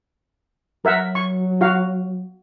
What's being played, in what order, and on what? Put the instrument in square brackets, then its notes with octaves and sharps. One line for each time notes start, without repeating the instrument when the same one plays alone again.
[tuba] F#3 [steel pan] A#4 E5 F#5
[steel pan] C#6
F#4 F5